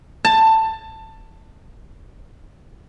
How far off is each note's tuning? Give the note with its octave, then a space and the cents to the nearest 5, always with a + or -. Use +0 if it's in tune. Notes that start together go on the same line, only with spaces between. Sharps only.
A5 +15